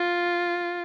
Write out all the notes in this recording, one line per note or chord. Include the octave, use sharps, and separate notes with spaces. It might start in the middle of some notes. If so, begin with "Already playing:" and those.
Already playing: F4